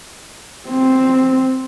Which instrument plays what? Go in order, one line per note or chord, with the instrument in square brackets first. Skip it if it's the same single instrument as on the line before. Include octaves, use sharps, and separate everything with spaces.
[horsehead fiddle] C4